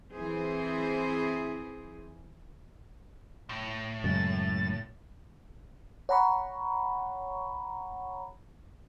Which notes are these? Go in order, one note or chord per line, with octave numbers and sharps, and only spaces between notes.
E3 C4 E4 G#4 C5
A2
F#2 C#3 G#3 A6
C#5 F#5 A#5 B5 C#6